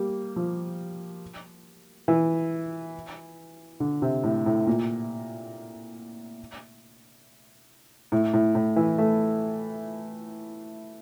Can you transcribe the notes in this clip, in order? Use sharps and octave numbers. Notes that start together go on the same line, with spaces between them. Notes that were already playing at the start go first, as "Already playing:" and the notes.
Already playing: G3 A#3
F3
E3
D3
C3
A2
A2
A#2
A2
A2
A2
E3
A3